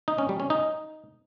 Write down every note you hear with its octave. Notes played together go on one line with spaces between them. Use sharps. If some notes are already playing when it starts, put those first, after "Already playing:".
D#4
C#4
G3
C#4
D#4